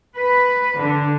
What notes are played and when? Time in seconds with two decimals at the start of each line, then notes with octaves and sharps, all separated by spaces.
0.18 B4
0.80 D3